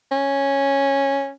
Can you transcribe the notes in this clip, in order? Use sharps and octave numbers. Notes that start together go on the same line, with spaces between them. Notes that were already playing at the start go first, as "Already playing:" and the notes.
C#4